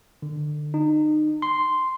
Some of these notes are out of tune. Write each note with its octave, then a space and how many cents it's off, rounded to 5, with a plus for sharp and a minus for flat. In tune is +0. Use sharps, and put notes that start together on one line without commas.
D3 +25
D#4 -30
C6 -5